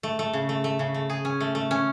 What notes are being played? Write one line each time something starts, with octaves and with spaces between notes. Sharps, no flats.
A3
A3
C#3
A3
A3
C#3
A3
G#4
C#4
A3
A3
C#4